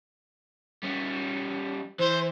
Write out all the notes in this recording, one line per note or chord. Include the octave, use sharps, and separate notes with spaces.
G3 C#4
E3 C5